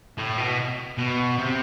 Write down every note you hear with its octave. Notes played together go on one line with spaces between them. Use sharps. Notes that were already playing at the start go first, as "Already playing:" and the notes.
A2
B2
B2
C3